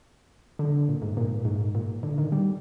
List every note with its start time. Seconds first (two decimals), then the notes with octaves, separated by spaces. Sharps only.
0.59 D3
0.89 A#2
1.02 G#2
1.17 A#2
1.45 G#2
1.75 A#2
2.03 D3
2.18 D#3
2.32 G3